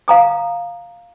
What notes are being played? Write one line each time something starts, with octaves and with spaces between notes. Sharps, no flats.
F5 A#5 D#6